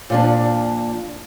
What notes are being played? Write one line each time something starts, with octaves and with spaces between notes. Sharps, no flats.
A#2 F3 D4